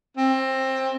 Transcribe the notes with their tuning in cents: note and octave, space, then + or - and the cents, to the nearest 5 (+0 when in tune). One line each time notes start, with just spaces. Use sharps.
C4 +20